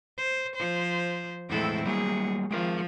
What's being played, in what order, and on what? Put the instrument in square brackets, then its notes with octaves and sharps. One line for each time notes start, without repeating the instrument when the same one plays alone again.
[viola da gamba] C5
F3 C5
[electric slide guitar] E2 A2 G#3 [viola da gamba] C4 E4 A4
[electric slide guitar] F#3 G3 A#3 [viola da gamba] G#4
[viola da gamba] F3 [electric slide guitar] G#3 G#4 A#4